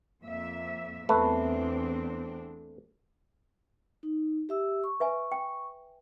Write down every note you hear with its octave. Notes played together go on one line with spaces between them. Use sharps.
F2 A#3 E5
E2 A3 C4 D4 B4
D#4
G4 E5 E6
C#6
B4 E5 G#5
G5